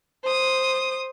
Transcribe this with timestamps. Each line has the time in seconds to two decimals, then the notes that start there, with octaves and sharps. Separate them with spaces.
0.24 C5 D#6